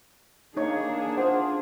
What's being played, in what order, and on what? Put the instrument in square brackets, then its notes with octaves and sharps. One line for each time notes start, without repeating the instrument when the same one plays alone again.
[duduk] A#3 [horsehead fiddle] D4 G#4 [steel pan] D#4 C#5
[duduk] F4 [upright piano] C5 F#5